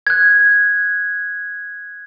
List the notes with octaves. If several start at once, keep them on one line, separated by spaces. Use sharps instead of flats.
F#6 G#6